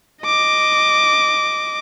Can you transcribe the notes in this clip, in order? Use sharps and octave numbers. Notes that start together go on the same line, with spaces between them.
D#5 D6